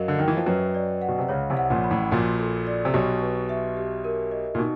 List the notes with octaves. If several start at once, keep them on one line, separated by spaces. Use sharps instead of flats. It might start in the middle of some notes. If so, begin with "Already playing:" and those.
Already playing: F#2 F#3 A#4 D#5 F5
D3
D#3 G5
E3
F3
F#2 F#3 B4
D5
F#5
B2
C3
C#2 C#3 C#5
C2 C3
F#5
A#1 A#2
B5
A1 A2
A#1 A#2 F#4
A4
D5
C3
B1 B2 G4
B4
E5
G4
A#4
D#5
A#2
B2 D#4